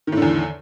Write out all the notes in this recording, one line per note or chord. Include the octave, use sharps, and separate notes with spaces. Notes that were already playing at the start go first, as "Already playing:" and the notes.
E2 A2 D3 D#3